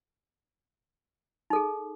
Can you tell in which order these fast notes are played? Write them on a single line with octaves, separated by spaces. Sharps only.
D#4 A4 G#4